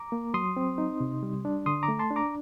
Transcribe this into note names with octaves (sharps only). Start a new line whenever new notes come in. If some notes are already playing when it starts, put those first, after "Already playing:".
Already playing: A#5 D6
A#3
F#3 C6 D#6
C4
D#4
C3
G3
D4
D3 C6 D#6
A#5 D6
A3
A5 C6
D4
A#5 D6